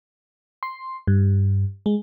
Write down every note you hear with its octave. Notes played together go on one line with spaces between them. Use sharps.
C6
G2
G#3